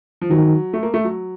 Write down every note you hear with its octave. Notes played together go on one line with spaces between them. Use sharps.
F3
D#3 F#3
A3
A#3
A3
F#3